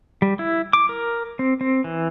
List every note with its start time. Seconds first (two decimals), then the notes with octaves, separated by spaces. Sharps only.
0.22 G3
0.39 E4
0.73 D6
0.89 A#4
1.39 C4
1.61 C4
1.84 E3